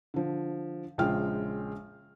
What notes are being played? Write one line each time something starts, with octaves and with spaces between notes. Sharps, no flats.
D3 F3
A#1 C#3 G#3 F4 G5 F6